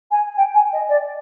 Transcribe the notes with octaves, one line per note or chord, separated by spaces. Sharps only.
G#5
G5
G#5
D#5
D5